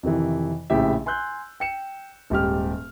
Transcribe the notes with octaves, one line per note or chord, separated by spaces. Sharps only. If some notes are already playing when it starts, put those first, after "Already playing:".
F2 C3 D#3 E3
A#1 A2 C#3 G4 E5
G#5 C6 E6 F#6 G6
G5 C#7 E7
D#1 G#2 G4 F6